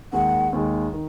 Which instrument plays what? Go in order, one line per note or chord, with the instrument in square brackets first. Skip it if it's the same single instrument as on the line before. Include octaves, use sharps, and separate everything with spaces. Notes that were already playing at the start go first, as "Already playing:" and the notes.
[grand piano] D#2 D#3 G#3 [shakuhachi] F#5
[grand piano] D#2 D#3 G#3
D#3